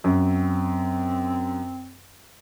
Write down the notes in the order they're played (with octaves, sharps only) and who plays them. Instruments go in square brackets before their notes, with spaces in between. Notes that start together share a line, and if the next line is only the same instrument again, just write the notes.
[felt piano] F#2 [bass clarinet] C4